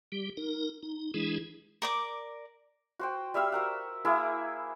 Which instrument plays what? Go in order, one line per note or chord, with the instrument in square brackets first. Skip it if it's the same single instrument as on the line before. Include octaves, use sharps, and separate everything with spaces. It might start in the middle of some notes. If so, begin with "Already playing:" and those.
[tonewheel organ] G3 G4
D#4 A#4
D#4
E3 G#3 D4 E4 G#4
[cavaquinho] A#4 D5 D6
[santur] F#4 C5 G5
G3 E5 F5 E6
F#4 A#4 F#5
A#3 E4 G#4 E5